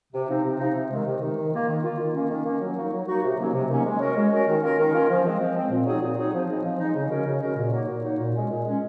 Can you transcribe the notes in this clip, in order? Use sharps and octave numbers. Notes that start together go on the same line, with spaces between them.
C3
F3 C4 D#4
C3
F3 C4 D#4
C3
D#3 G#3
C3
D#3 G#3
D#3
A#3 F4
D#3
A#3 F4
D#3
A#3 C#4
D#3
A#3 C#4
F#3
A#3 D#4 F#4
F#3
A#3 D#4 F#4
C3
D#3 F#3 A#3 C#4
C3
D#3 F#3 A#3 C#4
G#3
C#4 F#4 A#4
G#3
C#4 F#4 A#4
D#3
A#3 C#4 F4 A#4
D#3
A#3 C#4 F4 A#4
F3
G#3 C4
F3
G#3 C4
A#2
F#3 C4 D#4 G#4
A#2
F#3 C4 D#4 G#4
F3
G#3 C4 D#4
F3
G#3 C4 D#4
C#3
G#3 C#4 F#4 A#4
C#3
G#3 C#4 F#4 A#4
A#2
F#3 A#3 D#4
A#2
F#3 A#3 D#4
A#2
G#3 C#4
A#2
G#3 C#4